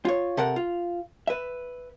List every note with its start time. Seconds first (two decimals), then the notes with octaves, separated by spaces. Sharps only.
0.05 F4 C#5
0.37 C3 A4 A#4 F#5
0.56 F4
1.27 B4 E5